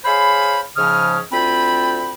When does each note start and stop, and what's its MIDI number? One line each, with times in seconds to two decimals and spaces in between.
0.05 0.60 68
0.05 0.60 72
0.05 0.60 73
0.05 0.60 77
0.05 0.60 83
0.76 1.18 44
0.76 1.18 49
0.76 1.18 53
0.76 1.18 61
0.76 1.18 87
0.76 1.18 89
1.32 2.14 38
1.32 2.14 60
1.32 2.14 65
1.32 2.14 79
1.32 2.14 83